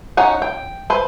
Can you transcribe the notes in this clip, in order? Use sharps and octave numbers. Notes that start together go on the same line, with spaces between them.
C#4 D#4 F#5
G5
B4 C5